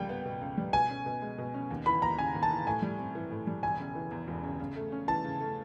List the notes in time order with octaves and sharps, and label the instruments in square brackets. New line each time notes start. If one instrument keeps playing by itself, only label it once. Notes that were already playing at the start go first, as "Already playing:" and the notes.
Already playing: [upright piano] C#2 G3 A#3 [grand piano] G5
[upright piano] B3
B2
C#2
G3
[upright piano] B2 [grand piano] G#5
[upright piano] C#4
B2
G#3
B2
C#4
D#2
[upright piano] E3 [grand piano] B5
[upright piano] D#2 [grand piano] A#5
[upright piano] C#3 [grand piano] G#5
[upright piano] D#2
[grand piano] A5
[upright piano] E3
[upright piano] A2 [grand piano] G#5
[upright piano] G3
C4
E3
A2
G3
[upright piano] E1 [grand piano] G#5
[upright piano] C#3
E3
E2
E1
C#3
C#3
A3
C#4
[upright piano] E3 [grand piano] A5
[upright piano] C#3
A3